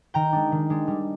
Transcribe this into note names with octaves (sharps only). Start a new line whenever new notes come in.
D#3 G5 A#5
G#3 D4
D#3
G#3 D4
G3